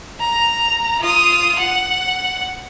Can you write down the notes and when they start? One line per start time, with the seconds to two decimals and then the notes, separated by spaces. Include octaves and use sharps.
0.20 A#5
1.01 F4 D#6
1.59 F#5